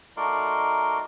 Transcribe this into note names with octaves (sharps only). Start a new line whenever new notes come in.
A3 D#4 F#4 A#4 D5 C6